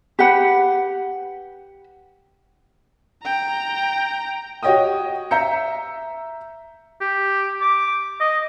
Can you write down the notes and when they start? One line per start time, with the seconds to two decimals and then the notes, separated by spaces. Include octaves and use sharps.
0.19 G4 B4 F#5 B5
3.23 G5 A#5
4.63 F#4 G4 C#5 D#5 G5 D#6
5.31 E5 A#5 G6 C#7
7.01 G4
7.61 D6
8.21 D#5